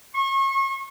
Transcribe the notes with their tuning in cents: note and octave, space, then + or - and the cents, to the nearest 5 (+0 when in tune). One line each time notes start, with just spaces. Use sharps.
C#6 -35